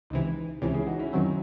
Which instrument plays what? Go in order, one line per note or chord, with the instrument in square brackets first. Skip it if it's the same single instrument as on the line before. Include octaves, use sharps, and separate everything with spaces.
[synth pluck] C#2 C3 E3 [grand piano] D#4
[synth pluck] C#2 C3 E3 [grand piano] C#4 E4
[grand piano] E4 G#4
D#4 F#4
C#4 E4
[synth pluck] F#2 D#3 F#3 C4